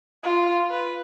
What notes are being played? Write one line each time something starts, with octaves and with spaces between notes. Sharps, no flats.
F4
B4